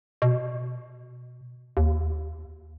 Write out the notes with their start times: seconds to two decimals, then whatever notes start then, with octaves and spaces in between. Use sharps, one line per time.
0.22 B2
1.77 D#2